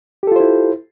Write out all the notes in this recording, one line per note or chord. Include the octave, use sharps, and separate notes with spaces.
E4 F4 G4 A4 C5